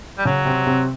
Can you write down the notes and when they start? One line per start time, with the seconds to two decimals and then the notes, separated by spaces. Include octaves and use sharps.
0.18 G3
0.25 C#3 F#3 C#4
0.45 C3 C4
0.67 C3 C4